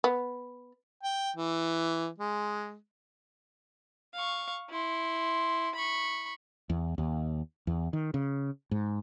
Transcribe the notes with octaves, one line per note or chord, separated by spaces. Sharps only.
B3
G5
E3
G#3
F5 C#6
E4 C6
B5 C#6
E2
D#2
E2
D#3
C#3
G#2